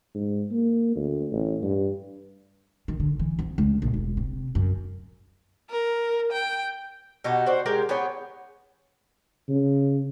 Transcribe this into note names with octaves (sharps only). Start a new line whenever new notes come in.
G#2
A#3
D2
A1
G2
D#3
D3
E3
F2
C#2
A#1
E1
C3
F#2
A#4
G5
B2 D#4 F#4 G4
F#4 C5 D5
G#3 G4 A#4
B3 G4 G#4 C#5
C#3